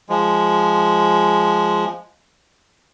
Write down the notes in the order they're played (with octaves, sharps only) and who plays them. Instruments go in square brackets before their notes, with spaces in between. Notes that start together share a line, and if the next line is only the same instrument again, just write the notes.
[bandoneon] F3 G#3